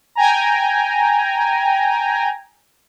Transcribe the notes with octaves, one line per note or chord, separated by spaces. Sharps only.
G5 G#5 A#5